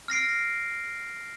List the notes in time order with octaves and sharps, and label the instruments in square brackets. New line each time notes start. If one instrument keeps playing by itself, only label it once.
[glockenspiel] F6 A#6 C7 D7